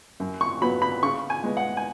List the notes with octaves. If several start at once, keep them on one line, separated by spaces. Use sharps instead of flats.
F#2
C#6
F#3 B3 B5
B5
C#3 C#6
G#5
G#3 B3
F#5
G#5